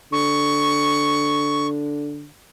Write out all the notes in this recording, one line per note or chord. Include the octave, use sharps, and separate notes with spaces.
D3 C#6